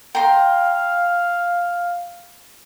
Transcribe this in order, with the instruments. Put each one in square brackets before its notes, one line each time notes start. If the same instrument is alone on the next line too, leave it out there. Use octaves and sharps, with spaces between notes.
[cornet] F5 [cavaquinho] G5 A#5 C6